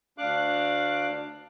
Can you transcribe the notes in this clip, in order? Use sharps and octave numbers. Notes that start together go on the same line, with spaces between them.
D2 D4 F5 D6 F#6